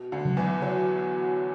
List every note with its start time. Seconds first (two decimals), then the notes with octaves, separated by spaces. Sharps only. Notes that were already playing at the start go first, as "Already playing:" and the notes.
Already playing: B2
0.12 D2 D3
0.25 C#3 F#3
0.37 E2 E3
0.62 F#3